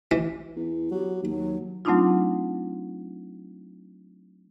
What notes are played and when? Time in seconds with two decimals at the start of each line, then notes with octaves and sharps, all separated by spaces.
0.11 E3
0.56 E2
0.91 F#3 G4
1.22 D#2 F#3
1.85 F#3 A3 C4 D4 D#4 F4